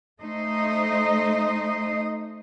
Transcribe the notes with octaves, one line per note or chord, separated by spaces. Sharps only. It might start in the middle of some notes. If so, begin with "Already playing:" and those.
A3 D#4 C5 D#5